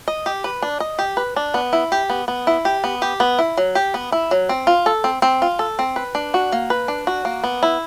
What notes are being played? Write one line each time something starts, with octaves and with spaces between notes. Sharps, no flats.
D#5
G4
B4
D4
D#5
G4
B4
D4
B3
E4
G4
B3
B3
E4
G4
B3
G4
B3
E4
F#3
G4
B3
E4
F#3
C4
F4
A4
C4
C4
F4
A4
C4
B4
D4
F#4
A#3
B4
D4
F#4
A#3
B3
E4